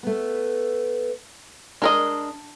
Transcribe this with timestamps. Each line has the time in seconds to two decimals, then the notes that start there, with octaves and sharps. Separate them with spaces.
0.03 A3 B3
1.82 G#3 D4 A#4 D#5